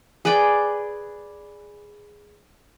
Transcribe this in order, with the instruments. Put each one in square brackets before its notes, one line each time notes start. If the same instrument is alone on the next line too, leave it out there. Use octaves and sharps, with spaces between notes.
[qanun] G#4 B4 D5 G5